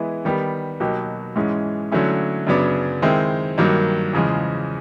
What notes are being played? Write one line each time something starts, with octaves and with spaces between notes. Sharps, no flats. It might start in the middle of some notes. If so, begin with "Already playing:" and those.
Already playing: E3 G#3 B3 E4
D#3 G3 B3
B2 F#3 A#3 D#4 G4
G#2 E3 G#3 C#4
D3 F#3 A3 C#4 E4
F#2 C#3 F#3 B3 D4
D#3 G#3 C4 E4
G2 D#3 F#3 A#3
E2 C#3 F3 G#3